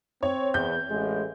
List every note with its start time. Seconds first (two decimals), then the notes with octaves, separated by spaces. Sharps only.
0.23 C4 C#5
0.54 E2 G6
0.90 A1 G#3